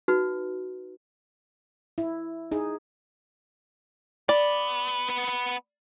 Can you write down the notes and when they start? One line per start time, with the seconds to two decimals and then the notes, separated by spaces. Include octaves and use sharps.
0.08 D#4 F#4 B4
1.98 E4
2.52 D#4 G#4
4.29 B3 D5 B5